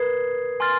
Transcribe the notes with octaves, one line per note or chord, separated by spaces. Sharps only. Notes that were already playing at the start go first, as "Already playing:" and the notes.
Already playing: A#4 B4 D#6 G#6 C7
G#5 C6 F6 A6